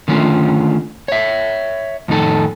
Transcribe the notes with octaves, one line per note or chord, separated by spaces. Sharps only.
D3 D#3 A3 C#4 F4
C#5 E5
F2 A2 D#3 D#4 A4